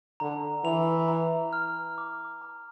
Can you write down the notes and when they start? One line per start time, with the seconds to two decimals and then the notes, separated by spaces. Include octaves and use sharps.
0.20 D3 A#5
0.65 E3 F7
1.08 A#5
1.53 F6
1.98 D6
2.42 A#5